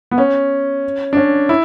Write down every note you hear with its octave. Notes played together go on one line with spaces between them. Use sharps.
B3
C#4
D4
C#4
E4